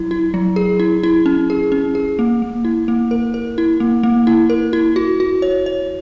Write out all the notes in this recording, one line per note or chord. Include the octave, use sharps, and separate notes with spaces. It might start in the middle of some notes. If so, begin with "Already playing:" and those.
Already playing: F#3 E4
E4
F#3
G#4
E4
E4
C#4
G#4
C#4
G#4
A#3
A#3
E4
A#3
A#4
A#4
E4
A#3
A#3
E4
A#4
E4
F#4
F#4
C#5
C#5